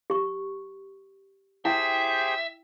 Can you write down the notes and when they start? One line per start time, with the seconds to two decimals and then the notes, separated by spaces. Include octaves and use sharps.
0.10 G4 C#6
1.65 E4 G4 G#4 C5 E5 G5